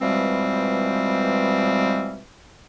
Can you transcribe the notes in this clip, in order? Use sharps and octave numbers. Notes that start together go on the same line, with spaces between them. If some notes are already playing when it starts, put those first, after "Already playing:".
B2 E3 F3 G3 G#3 C4